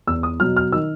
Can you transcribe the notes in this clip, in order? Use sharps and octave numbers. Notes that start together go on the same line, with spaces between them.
E2 E6
D#6
B2 F#3 F6
F6
D#3 E6